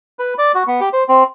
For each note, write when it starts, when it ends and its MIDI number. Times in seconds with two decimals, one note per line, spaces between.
0.19 0.34 71
0.38 0.52 74
0.55 0.63 66
0.67 0.80 59
0.81 0.89 67
0.93 1.04 72
1.09 1.24 60